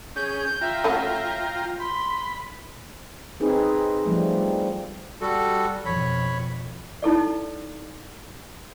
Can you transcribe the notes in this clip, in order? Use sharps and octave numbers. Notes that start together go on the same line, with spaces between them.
C#4 G#4 G6
F4 E5 G5 A#5
A3 C#4 F#4
B5 C6
C4 D#4 G#4 B4
F3 G3 A3
G3 F#4 A4
F2 B2 C#5 B5
D#4 E4 A4 D5